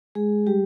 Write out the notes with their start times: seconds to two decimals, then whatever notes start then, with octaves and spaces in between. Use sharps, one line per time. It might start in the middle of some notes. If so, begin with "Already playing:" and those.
0.15 G#3 G#4
0.47 G3 G4